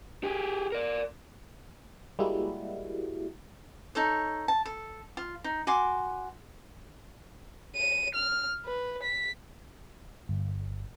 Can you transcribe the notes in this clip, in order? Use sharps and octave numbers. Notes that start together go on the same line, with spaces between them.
G4 G#4
A#4 D5
G3 G#3 A#3 E4 F#4
D#4 A4 C#5
A5
A4
F4
D#4
F#4 G#5 C6 D6
D#7
F6
B4
B6
G1